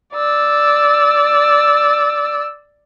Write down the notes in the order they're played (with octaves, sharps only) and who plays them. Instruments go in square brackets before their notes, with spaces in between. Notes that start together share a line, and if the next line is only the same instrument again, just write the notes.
[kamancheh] D5 E6